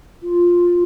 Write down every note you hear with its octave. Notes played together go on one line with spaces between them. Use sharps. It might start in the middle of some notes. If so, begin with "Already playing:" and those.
F4